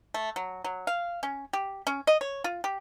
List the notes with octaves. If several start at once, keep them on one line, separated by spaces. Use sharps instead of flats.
A3
F#3
F#3
F5
C#4
G4
C#4
D#5
C#5
F4
G4